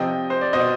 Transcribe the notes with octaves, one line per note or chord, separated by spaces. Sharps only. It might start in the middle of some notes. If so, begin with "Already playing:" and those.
Already playing: C3 F3 D#5 G5
C5
D5
B2 C5 D#5